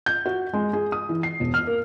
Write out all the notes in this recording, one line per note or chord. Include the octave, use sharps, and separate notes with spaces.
G6
F#4
G#3
G#4
D#6
E3
C7
E1
F6
A#3